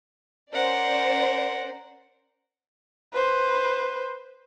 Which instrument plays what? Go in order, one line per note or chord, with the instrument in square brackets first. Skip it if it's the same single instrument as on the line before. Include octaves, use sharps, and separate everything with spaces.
[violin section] C#4 C5 D5 [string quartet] A#4 F#5
[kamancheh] B4 C5